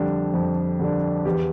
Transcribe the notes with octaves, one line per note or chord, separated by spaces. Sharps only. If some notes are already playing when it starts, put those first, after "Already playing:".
Already playing: F2 D3 G3 D4
F2
D3 G3 D4
E2 G4